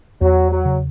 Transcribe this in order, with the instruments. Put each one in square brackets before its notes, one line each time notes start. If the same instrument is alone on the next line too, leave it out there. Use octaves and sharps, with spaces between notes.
[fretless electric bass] E2 [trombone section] F#3
[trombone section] F#3
[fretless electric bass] C#3